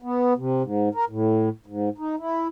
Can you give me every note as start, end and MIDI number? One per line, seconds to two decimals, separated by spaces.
0.02 0.34 59
0.37 0.62 48
0.63 0.89 44
0.95 1.05 70
1.10 1.49 45
1.66 1.89 44
1.98 2.16 63
2.19 2.48 64